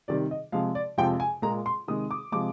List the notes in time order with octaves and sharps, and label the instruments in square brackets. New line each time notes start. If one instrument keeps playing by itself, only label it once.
[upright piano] C3 D#3 G3 D5
D#5
C3 F3 G#3 F5
D5
F2 C3 F3 G#3 G5
G#5
A#2 G#3 A#5
C6
C3 D#3 G#3 D#6
D6
C3 F3 G#3 D6